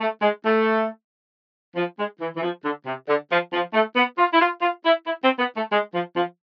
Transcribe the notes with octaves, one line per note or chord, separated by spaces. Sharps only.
A3
G#3
A3
F3
G#3
E3
E3
F3
D3
C3
D3
F3
F3
A3
B3
F4
E4
F4
F4
E4
E4
C4
B3
A3
G#3
F3
F3